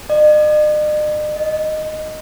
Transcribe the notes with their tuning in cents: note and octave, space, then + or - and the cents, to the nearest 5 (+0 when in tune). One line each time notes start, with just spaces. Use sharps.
D#5 -45
D#5 -5